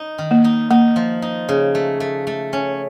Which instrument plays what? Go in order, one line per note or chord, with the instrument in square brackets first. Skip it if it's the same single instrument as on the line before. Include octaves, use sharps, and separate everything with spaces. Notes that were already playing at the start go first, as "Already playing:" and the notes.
Already playing: [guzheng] D#4
D#3
[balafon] A#3
[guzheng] D#4
[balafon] A#3 [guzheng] D#4
[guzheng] F3
D#4
C#3
A3
A3
A3
C#4